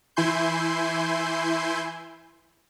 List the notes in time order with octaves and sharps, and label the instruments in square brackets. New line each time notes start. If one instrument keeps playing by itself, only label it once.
[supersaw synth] E3 E4 G#5 C6 G6